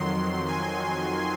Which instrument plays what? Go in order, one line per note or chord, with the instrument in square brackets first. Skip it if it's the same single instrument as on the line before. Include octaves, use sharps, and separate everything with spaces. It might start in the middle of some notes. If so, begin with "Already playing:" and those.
Already playing: [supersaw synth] F2 D#3 F#3 C6
G#5